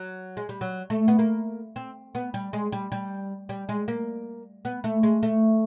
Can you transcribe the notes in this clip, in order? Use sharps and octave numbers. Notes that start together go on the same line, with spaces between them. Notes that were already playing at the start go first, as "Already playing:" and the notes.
Already playing: F#3
G#3
G3
F#3
A3
B3
A#3
C4
B3
G3
G#3
G3
G3
G3
G#3
A#3
B3
A3
G#3
A3